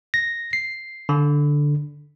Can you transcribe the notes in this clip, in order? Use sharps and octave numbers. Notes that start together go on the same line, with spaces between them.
A#6
C7
D3